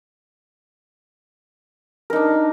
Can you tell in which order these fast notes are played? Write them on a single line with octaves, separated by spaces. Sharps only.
A#4 D#4 D4